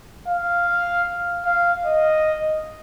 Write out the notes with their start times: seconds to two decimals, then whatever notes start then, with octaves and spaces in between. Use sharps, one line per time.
0.28 F5
1.46 F5
1.85 D#5